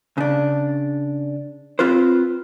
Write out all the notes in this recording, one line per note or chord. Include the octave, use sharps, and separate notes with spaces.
C#3 D4
C4 F4 B4 C5